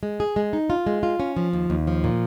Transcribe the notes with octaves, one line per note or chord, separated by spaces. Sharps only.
G#3
G#4
G#3
D#4
F4
G#3
F4
C#4
F3
D#2
D#2
F3
A#2